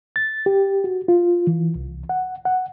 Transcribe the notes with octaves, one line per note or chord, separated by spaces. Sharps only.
A6
G4
F#4
F4
E3
C2
F#5
F#5